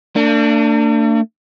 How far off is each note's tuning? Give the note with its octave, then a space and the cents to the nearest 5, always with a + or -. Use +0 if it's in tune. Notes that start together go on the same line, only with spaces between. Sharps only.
A3 +45 D4 +0